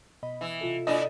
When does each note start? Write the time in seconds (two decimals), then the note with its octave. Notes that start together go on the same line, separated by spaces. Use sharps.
0.23 B2 D#5 B5
0.41 E3 E5 E6
0.61 C3 F4 A4
0.87 A#2 D4 E4 D#5